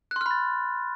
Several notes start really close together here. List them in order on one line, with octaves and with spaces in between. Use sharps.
F#6 C6 F6 B5 A6